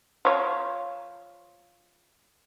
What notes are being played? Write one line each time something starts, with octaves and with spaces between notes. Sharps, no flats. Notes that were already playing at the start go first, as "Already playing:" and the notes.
F3 C#5